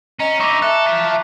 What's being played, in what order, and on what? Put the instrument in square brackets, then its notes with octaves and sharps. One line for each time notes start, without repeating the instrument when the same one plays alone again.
[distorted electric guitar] C#4 [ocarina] D#5 [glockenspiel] A#5
[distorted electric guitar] D#4 E4 [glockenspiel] C#6 D6 F7
[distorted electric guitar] A4 [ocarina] E5 [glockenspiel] F#6
[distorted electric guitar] F4 A5 [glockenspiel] B6